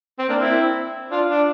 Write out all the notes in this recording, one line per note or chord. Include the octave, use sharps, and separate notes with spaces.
C4
A#3 D4
C4 E4
D4 F4
D4